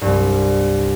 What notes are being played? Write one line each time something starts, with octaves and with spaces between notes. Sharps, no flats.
C2 G2